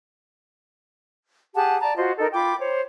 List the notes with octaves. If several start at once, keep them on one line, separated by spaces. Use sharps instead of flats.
G4 G#4 F#5 A5
D5 A5 A#5
F4 F#4 C5 D#5
D#4 A4 A#4
F4 G5 B5 D6
C5 C#5